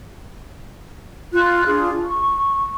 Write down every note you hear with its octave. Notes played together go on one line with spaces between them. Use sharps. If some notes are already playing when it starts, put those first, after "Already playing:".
F4 F#6
D4 F4 G#4
C#6